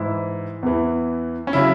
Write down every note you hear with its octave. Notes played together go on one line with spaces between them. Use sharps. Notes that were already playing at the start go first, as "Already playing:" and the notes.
Already playing: G#2 E3 E4
E2 E3
C#4
C#3 F#3 E4